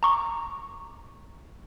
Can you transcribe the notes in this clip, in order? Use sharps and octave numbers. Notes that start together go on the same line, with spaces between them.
A#5 C#6 D6